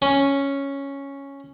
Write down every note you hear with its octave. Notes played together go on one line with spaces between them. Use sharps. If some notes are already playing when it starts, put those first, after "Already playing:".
C#4